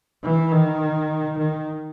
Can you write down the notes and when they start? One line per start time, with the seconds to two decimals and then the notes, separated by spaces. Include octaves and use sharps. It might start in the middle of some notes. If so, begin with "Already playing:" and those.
0.23 E3
0.52 D#3
1.38 D#3